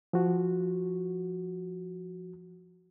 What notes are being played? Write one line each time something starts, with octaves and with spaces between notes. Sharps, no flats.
F3 F#4